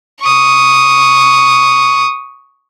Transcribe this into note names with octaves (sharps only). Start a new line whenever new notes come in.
C#6 D#6